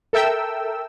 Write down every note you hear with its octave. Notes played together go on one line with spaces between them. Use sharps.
A4 A#4 E5 G5 E6